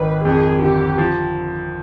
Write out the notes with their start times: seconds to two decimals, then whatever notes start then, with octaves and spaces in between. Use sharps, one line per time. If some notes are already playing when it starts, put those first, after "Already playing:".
Already playing: G#1 D#3 B4
0.25 F2 G#4
0.62 D3 G4
0.98 F3